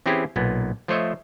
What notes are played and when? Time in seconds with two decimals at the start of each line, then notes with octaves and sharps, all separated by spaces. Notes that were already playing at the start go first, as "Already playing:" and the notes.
0.06 E3 C4 C#4 E4 G4 G#4
0.36 B1 A#2 B3
0.88 F3 A3 C5 C#5 D#5 E5